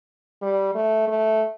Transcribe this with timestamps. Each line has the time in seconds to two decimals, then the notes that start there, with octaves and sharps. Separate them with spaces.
0.42 G3
0.75 A3
1.08 A3